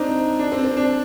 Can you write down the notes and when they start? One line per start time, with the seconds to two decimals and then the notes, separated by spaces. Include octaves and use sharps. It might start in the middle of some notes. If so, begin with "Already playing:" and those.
Already playing: C4 D4 D#4
0.39 D4
0.52 C4
0.64 C4
0.77 D4